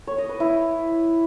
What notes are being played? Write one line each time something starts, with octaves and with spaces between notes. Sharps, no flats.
C#5
D#5
B4
E4